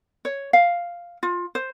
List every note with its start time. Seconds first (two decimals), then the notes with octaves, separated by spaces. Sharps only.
0.25 C#5
0.53 F5
1.23 F4
1.55 C5